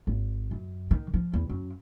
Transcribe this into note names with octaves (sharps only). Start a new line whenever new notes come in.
G#1
F#2
D#3
F3
E2
F#2